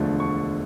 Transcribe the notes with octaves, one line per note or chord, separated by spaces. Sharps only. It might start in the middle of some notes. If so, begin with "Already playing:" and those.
Already playing: E1 D2 D3 F3 A3
C#6